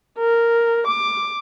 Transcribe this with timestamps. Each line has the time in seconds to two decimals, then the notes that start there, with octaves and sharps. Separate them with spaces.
0.19 A#4
0.87 D6